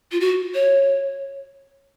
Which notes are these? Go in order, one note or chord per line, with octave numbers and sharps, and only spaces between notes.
F4
F#4
C#5